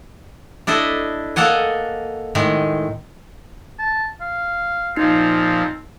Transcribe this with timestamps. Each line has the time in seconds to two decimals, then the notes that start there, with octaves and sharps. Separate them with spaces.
0.67 D4 E4 A4 D#5
1.36 A#3 A4 D#5 F#5 G#5
2.35 A2 D#3 G#3
3.79 A5
4.21 F5
4.96 A#2 F3 C4 D#4 C7